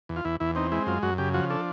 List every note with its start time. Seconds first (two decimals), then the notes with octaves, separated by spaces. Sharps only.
0.09 E2
0.16 F4
0.25 E2 E4
0.40 E2 E4
0.55 C4 D#4
0.72 G#3 E4
0.87 F#2 F4
1.02 F#2 F#4
1.18 C#3 G4
1.34 F3 F#4
1.50 D4 A4